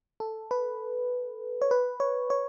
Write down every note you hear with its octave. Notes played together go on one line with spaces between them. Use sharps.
A4
B4
C#5
B4
C#5
C#5